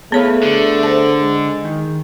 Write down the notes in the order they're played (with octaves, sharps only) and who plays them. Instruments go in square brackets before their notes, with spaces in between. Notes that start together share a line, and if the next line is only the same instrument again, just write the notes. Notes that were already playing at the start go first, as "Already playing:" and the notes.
[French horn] A3 [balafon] B3 C#5 F5 [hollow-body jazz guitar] G#4 B4
[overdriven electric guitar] D3
[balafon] C5 A5
[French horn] G#3
[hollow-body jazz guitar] D#3